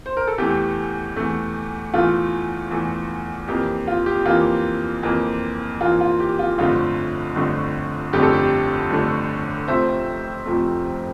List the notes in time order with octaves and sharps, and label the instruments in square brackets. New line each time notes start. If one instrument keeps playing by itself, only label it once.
[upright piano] C5
A#4
A4
E2 E3 A3 G4
E2 E3 A3
E2 E3 A3 F4
E2 E3 A3
F2 E3 A#3 G4
F4
G4
F2 E3 A#3 F4
F2 E3 A#3
F2 E3 A#3 F4
F4
G4
F4
G1 F2 D3 A3 F4
G1 F2 D3 A3
G1 F2 D3 A3 G4
A4
G4
G1 F2 D3 A3
F1 F2 C3 F3 A3 C5 E5
F1 F2 C3 F3 A3